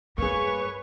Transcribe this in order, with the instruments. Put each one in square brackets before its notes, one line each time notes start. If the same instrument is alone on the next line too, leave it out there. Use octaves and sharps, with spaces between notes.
[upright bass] G2 [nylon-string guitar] A#3 G#4 [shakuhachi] B4 [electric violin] C#5 C#6